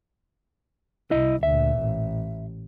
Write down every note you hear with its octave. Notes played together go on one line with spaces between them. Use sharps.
C2 E4 D#5
D2 A#2 E5
A1